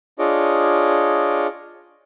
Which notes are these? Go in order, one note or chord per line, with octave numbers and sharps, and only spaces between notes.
D4 F4 G#4 C#5 D#5 D6